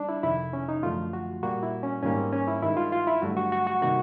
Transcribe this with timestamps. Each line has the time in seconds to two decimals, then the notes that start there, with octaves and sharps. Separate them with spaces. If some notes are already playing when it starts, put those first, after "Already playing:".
Already playing: G3 D4
0.09 E4
0.23 F2 C3 D#3 E4
0.53 C#4
0.69 D#4
0.83 F#2 D3 F3 A3 F4
1.13 F#4
1.43 A#2 G3 A#3 F#4
1.63 E4
1.83 C#4
2.03 G#2 D#3 G3 A#3 C#4
2.18 C4
2.33 C#4
2.48 E4
2.62 G2 D#3 G#3 E4
2.77 F4
2.92 F4
3.07 E4
3.22 G2 D3 F#3 A3 F#4
3.37 F#4
3.52 F#4
3.67 F#4
3.82 C3 D#3 G3 A#3 F#4